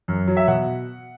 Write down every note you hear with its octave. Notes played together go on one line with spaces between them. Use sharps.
F#2
F#3
E5
B2 F#5